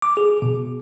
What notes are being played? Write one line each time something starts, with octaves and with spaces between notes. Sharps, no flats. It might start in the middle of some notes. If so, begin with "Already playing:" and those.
D6
G#4
B2